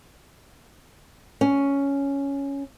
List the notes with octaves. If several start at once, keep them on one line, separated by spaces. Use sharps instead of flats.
C#4